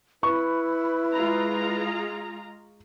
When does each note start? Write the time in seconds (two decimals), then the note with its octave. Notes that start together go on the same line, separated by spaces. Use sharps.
0.23 E4 B4 C#6
1.12 G#3 F4 A#5